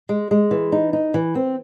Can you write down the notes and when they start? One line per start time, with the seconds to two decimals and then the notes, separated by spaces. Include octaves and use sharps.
0.09 G#3
0.31 G#3
0.51 E3
0.72 D#4
0.93 D#4
1.14 E3
1.35 C4